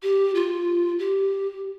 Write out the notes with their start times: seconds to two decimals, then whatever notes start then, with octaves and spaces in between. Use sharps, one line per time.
0.03 G4
0.35 F4
0.99 G4